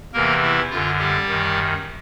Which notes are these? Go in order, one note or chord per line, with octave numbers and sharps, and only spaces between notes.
E2 C3 E3 A#3 A#4
E4
F#2 D3 F4
G3 G4
F#2 D#3